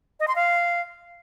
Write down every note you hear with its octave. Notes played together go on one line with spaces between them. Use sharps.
D#5
C6
F5